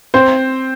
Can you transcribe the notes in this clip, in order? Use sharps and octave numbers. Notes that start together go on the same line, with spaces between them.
C4 C5